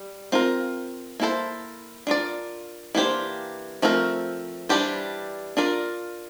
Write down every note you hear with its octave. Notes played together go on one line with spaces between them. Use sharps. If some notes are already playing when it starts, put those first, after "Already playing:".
Already playing: G3
C4 F4 A#4
A#3 E4 A4 C5
D4 F4 A#4 D5
E3 A#3 D4 G4 C5
F3 A3 C4 E4 A#4
E3 G3 D4 G4 C5
D4 F4 A#4 D5